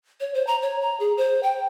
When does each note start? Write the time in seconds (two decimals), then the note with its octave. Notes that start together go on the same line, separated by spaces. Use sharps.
0.20 C#5
0.34 C5
0.47 A#5
0.62 C#5
0.82 A#5
1.00 G#4
1.17 C5
1.43 G5